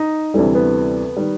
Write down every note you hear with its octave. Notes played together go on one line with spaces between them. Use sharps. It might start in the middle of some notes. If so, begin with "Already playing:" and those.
Already playing: D#4
D2 C3 E3 G3
B3
D#3 G3